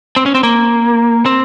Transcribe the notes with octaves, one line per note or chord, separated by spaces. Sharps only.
C4
C#4
C4
A#3
C4